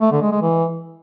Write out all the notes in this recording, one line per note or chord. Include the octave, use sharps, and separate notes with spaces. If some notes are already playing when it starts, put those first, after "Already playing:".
A3
D3
G#3
G#3
E3